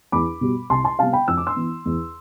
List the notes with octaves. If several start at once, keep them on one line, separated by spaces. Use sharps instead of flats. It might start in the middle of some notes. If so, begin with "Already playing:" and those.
E2 B5 D6
B2 G3 B3
C2 A5 C6
A5 C6
C3 G3 B3 F5 A5
G5 B5
F2 E6
D6
C6 E6
E3 B3
E2